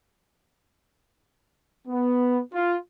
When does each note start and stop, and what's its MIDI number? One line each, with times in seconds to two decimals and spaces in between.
1.88 2.40 59
2.53 2.77 65